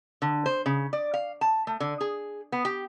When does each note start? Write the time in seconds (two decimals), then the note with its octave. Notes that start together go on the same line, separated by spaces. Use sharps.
0.22 D3
0.46 C5
0.66 C#3
0.93 D5
1.14 F5
1.41 A5
1.67 A3
1.80 D3
2.01 G#4
2.52 B3
2.65 G4